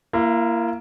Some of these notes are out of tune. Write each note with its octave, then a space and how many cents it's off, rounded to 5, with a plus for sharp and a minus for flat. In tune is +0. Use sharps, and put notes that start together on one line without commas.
A#3 +0 E4 +35